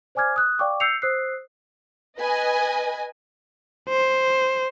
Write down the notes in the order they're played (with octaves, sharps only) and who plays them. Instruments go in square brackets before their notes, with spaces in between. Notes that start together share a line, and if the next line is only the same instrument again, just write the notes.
[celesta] C5 D5 G#5 D6 F6 G#6
D#6 F#6
D5 F5 G5 C#6 D6
E6 G6 C7 C#7 F7
C5 D#6 E6 F#6 C7
[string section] B4 D#5 G#5
[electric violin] C5